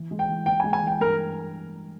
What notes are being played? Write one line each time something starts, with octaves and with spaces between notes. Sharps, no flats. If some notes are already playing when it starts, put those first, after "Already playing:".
Already playing: E3
G#3
G5
E3
E3 G5
G#3 G#5
G#5
E3 G5
G2 A#4